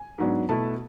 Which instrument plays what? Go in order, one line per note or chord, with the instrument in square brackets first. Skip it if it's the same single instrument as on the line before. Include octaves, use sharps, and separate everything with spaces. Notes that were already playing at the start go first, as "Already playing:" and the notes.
Already playing: [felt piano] G#5
G#2 F#3 B3 D4
B2 A3 E4 A5